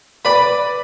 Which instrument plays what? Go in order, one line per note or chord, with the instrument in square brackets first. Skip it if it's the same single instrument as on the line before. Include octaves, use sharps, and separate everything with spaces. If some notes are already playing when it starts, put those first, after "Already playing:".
[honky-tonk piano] B4 D5 [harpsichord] B5